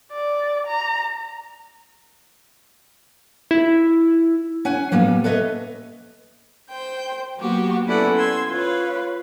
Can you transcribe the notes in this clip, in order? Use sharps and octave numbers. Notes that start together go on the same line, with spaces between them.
D5
A#5
E4
C#4 F#5 G#5
A2 G3 A#3 B3
A4 B4 C#5 D#5 E5
C5 G5 G6
F#3 A#3 B3 F#4 G4
B3 C#4 E4 A4 D5 F#5
C6 E6 G#6
F4 B4 C#5 F5